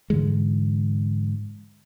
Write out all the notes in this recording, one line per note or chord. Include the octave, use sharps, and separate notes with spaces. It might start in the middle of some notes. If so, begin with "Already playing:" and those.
G#2 D3 E3 G#3